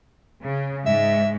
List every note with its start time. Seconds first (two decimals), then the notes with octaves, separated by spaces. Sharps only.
0.43 C#3
0.86 G#2 E5